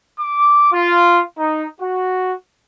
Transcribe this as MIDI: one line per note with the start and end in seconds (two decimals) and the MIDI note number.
0.18 0.67 86
0.72 1.19 65
1.37 1.65 63
1.78 2.31 66